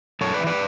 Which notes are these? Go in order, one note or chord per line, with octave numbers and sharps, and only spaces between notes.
F#2 A4 C#5
B4 D5
E3
B4 D5